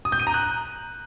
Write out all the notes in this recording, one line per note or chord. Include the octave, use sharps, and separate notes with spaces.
D#6
G6
D#7
A#5
F#6